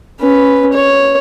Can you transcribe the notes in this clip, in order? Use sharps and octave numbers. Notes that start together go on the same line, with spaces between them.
C#4 B4
C#5